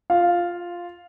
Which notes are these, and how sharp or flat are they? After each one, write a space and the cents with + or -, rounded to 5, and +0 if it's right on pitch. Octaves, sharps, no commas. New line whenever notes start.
F4 +0 F5 +0